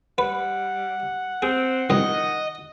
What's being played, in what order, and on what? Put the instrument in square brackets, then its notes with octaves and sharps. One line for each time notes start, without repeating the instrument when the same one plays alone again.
[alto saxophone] G3 [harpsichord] B4 [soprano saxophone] F#5
[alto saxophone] C4 [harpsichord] G#4
[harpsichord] C2 F2 [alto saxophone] D#3 [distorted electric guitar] D#5